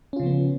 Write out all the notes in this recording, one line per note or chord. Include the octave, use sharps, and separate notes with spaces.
C#3 F3 B3 C#4 F4